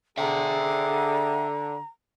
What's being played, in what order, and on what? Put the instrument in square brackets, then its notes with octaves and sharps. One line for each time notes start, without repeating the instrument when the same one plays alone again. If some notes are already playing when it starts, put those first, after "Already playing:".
[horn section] D3 [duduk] G#4 [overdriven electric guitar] E5 G5 [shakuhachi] A#5